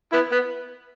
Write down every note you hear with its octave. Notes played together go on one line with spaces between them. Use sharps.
B3 E4
B3